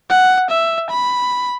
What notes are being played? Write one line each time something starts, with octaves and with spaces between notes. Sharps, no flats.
F#5
E5
B5